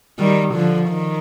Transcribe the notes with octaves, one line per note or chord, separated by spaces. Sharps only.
D#3 G3
D3 F3
D#3